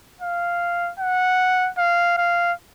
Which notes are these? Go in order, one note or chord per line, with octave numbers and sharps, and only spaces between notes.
F5
F#5
F5
F5